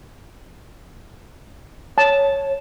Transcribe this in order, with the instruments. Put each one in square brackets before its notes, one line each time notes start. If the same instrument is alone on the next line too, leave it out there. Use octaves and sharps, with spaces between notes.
[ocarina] C#5 [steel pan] A5